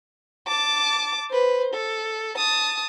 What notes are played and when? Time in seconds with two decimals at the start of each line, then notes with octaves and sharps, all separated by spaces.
0.47 A5 D6
1.31 B4 C5
1.74 A4
2.37 A5 D#6